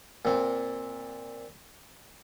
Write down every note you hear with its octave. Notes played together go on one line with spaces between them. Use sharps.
A#2 C4